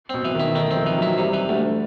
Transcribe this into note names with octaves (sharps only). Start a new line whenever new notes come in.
B2 C4
E3
D#3
E4
D#3 A3
C4
F3
E3
F#3
E4
C3 G3
E3
D2 A3